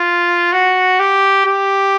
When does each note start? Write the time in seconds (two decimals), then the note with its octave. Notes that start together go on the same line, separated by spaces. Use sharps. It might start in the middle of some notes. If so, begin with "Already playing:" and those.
Already playing: F4
0.53 F#4
1.00 G4
1.46 G4